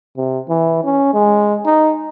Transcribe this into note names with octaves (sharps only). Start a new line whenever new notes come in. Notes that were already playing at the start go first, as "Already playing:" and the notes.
C3
E3
C#4
G#3
D#4